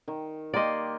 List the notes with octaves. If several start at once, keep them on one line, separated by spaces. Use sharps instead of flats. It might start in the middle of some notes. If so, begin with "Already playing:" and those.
D#3
A#3 G4 D5 D#5 C6